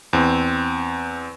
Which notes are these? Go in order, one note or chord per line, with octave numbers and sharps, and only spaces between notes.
E2 C4